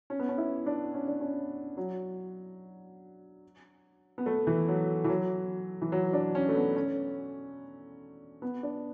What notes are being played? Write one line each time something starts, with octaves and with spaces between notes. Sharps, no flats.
C#4
B3
C#4
E4
D4
C#4
D4
C#4
F#3
B3
A3
E3
F#3
E3
F#3
E3
F#3
D4
C#4
A3
B3
C#4
B3
D4